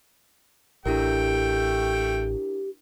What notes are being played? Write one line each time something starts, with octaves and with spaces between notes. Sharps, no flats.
A1 A3 D4 E4 G4 A#4 G5